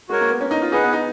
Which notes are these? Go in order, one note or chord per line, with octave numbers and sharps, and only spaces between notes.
G#3 F#4 A#4 C#5
A#3
B3
C#4
D#4
F4
D#4 G#4 B4 F#5
B3
D#4